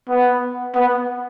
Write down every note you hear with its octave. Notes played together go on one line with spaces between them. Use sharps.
B3
B3